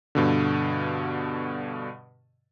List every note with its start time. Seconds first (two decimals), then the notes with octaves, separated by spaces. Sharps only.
0.15 G2 B2 D3